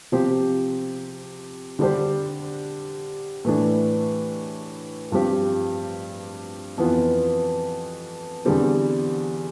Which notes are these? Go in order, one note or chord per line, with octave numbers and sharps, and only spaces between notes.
C3 F3 C4 G4 C5
D3 G3 D4 G4 C5
A2 E3 A3 D4
G2 F3 C4 G4
F2 E3 B3 F4
E2 D3 G3 C4